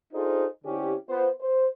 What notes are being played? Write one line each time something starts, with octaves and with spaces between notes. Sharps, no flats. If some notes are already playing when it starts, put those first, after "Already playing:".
D4 D#4 F4 G#4 A4 C5
D3 C4 C#4 E4 G4
B3 F4 C5
C5